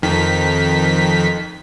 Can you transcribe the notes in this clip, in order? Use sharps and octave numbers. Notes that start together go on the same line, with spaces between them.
F2 D#3 B6